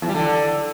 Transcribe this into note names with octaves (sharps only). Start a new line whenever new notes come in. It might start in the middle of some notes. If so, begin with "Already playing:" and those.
E2
G3
D3